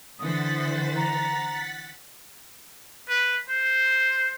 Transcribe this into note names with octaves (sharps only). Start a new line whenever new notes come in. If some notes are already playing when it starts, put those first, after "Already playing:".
D3 E3 C5 F#5 D#6 A6 B6
A#5
B4
C5